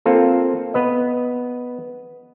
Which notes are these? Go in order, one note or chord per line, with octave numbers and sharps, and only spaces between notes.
A#3 C4 F4 A4
B3 B4 D#5